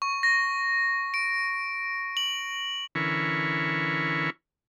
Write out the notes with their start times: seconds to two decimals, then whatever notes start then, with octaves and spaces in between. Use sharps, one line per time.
0.02 C#6
0.23 A#6
1.14 D7
2.17 F#7
2.95 D3 E3 C#4 E4 A#4 C#6